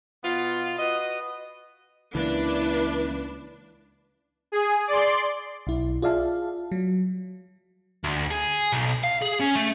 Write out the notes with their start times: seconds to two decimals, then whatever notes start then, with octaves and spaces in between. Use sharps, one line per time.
0.24 B2 B3 F4
0.78 F#4 B4 D#5
2.15 C#2 E3 A#3 D4 E4 B4
4.52 G#4
4.87 D5 C6
5.67 B1 E4
6.02 F4 G#4 D5 E5 F5 A5
6.72 F#3
8.04 D2
8.31 G#4
8.72 B1
9.04 F5
9.22 G#4
9.41 C#4
9.56 A3